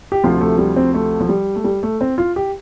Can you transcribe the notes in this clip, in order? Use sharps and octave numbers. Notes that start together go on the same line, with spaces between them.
G4
D2 C3 F3 F4
A3
G3
C4
A3
F3
G3
A3
G3
A3
C4
F4
G4